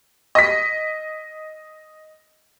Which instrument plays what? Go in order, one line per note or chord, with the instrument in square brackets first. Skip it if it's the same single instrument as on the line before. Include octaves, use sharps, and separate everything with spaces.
[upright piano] D#5 B6